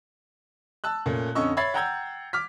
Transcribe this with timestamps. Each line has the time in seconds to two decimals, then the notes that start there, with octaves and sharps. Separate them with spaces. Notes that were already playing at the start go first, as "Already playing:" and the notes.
0.84 A5 E6 F#6
1.06 A#2 A3 C#4
1.35 F2 D3 C#4 D#5 C#6 E6
1.57 C#5 E5 B5 G#6 A6 C7
1.74 F#5 G5 A#5 E6 G6 G#6
2.33 D6 F6 B6